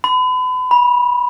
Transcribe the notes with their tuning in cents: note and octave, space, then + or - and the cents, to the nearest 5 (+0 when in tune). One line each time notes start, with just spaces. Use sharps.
B5 +35
B5 -20